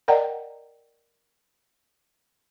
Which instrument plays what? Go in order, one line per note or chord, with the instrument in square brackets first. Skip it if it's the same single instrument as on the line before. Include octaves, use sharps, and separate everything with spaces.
[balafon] A#4 D5 D#5 F#5 G5 A#5